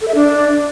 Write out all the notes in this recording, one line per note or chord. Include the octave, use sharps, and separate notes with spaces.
A4
E5
D4